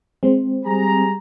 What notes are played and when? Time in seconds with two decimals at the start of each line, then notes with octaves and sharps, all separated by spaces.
0.23 G#3 C4
0.64 G3 G#4 A#5